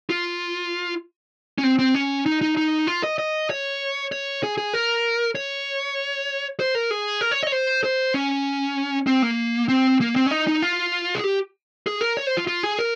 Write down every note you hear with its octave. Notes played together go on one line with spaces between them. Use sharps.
F4
C#4
C4
C4
C#4
D#4
D#4
D#4
F4
D#5
D#5
C#5
C#5
G#4
G#4
A#4
C#5
C5
A#4
G#4
A#4
C#5
D#5
C#5
C5
C5
C#4
C4
A#3
C4
A#3
C4
C#4
D#4
D#4
F4
G#4
G4
G#4
A#4
C#5
C5
F4
F4
G#4
A#4